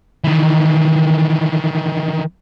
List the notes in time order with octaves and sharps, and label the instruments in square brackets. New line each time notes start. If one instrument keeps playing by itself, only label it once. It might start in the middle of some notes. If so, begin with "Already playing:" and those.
[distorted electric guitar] D#3 E3